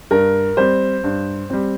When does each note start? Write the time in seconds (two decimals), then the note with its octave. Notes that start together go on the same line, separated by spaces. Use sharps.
0.11 G2 A#4
0.57 G3 C4 C5
1.04 G2
1.50 G3 C4